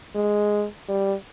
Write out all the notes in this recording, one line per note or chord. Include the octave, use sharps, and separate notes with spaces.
G#3
G3